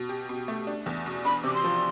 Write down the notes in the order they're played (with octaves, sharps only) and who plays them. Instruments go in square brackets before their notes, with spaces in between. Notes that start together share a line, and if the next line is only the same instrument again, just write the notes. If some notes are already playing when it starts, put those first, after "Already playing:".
Already playing: [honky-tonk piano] B2
G4
B2
A3
D4
E2
B2
[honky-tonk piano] D4 [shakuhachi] B5
[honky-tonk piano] C3 [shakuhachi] D6
[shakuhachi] C6
[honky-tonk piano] F3